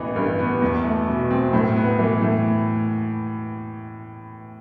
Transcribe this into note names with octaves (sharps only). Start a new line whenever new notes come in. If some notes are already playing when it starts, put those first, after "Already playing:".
Already playing: A1 E3 B3
G2
B3
E2
A3
B2
C4
A2
B3
E3
A2